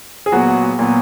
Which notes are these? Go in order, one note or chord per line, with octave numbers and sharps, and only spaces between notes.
G#4
A#2 F#3 B3 F#4
A#2 F#3 B3